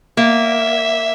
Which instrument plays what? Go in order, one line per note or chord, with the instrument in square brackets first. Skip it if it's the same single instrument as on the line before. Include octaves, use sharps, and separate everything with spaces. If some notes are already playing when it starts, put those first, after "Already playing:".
[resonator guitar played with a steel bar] A#3 [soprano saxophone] E5